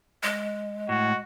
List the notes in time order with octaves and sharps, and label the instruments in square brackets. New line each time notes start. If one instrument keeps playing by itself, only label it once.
[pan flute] G#3
[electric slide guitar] A2 [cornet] F#4